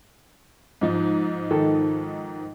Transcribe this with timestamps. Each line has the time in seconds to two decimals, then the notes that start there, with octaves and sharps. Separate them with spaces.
0.81 G#2 F3 D#4
1.51 D#3 A4